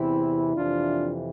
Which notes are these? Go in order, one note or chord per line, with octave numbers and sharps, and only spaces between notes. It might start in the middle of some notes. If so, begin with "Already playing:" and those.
Already playing: E2 C3 E3 C4 E4
F2 C3 E3 D4 F4